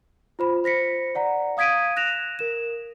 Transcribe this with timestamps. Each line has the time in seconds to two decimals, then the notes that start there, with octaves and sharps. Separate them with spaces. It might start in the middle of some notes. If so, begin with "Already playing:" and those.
0.39 F4 C5 B5
0.64 C5 A#6 B6 C#7
1.15 D5 F#5 A#5
1.57 F5 D#6 G#6 B6 D7 D#7
1.96 F#6 A#6 E7 F7
2.39 A#4 E7